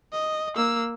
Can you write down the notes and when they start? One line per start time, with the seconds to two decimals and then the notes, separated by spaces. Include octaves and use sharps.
0.12 D#5
0.56 A#3 E6